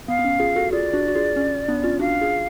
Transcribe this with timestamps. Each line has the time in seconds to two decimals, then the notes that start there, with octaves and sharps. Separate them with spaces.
0.08 B3 F5
0.19 B3
0.24 C#4
0.40 F4 G#4
0.56 F#4 A4
0.72 F4 G#4 D5
0.93 D4 F#4
1.08 F#4
1.15 F4 G#4
1.36 C#4
1.68 B3 D4
1.84 C#4 F4
2.00 D4 F#4 F5
2.21 F4 G#4